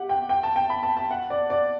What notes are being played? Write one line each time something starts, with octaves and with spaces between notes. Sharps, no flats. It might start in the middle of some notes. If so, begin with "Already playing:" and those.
Already playing: G4 F#5
G5
G5
A5
G5
B5
A5
A5
F#5
D5
D5